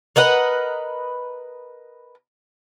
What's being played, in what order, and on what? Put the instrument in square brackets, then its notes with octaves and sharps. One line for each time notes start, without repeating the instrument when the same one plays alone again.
[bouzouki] A#4 B4 D#5 F#5